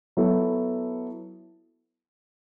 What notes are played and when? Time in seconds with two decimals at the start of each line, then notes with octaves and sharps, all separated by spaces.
0.17 F#3 B3 E4 A4